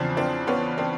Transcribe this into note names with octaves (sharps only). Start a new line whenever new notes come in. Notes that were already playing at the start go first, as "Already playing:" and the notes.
Already playing: E2 C#3 F3 C4 D4
C4 D4
B3 C#4
C4 D4